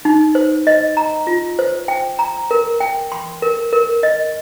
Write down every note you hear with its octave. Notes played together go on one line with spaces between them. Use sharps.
D#4
C5
D#5
A#5
F4
C5
G5
A#5
A#4
G5
C6
A#4
A#4
D#5